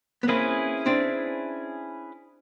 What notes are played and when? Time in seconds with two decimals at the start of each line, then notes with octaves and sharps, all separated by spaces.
0.23 B3
0.28 A#3 C4 C#4 E4 G#4 B4
0.86 C4 D4